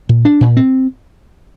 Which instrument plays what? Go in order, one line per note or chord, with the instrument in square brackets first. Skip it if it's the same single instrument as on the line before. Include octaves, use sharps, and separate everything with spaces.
[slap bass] A#2
D4
A#2
C4